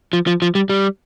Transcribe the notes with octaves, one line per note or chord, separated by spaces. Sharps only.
F3
F3
F3
G3
G3